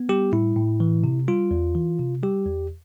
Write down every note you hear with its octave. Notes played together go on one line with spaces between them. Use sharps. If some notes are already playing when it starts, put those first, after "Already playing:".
Already playing: B3
G3 G4
A2 E4
A2
E3
C3
G3 F4
E2
E3
C3
G3 G4
E2